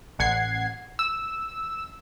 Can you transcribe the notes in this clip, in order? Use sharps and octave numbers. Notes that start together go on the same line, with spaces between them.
A1 F#5 G#6 C7
E6